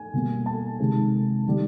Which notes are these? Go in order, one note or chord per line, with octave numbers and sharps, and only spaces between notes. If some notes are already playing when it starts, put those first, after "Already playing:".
Already playing: G#5
B2 G3 A#3
A5
C3 D#3 G#3
D#3 G3